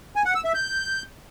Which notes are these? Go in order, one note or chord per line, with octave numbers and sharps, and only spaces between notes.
G#5
F#5
E6
E5
G6